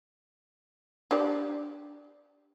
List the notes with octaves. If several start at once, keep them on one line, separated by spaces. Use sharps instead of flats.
D4 G4 D5